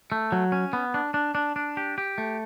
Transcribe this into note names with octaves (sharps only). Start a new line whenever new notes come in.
A3
F#3
C#4
B3
D4
D4
D4
D4
G4
G4
A3